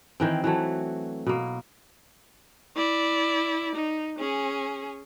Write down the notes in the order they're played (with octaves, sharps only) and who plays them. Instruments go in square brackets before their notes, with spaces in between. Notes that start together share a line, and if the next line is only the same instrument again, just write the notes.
[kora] D#3 E3 C4
E3 F#3 A3
B2 A#3
[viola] E4 D5
D#4
C#4 G#4